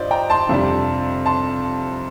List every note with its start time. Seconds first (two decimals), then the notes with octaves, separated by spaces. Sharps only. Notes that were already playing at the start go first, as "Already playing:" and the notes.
Already playing: G2 F4 C5 D5 D#5
0.11 G5 A#5
0.30 A5 C6
0.49 F2 C3 G3 D4
1.26 A5 C6